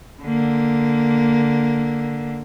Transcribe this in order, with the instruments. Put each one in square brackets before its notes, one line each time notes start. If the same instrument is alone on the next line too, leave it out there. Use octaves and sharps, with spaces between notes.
[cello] D3 A#3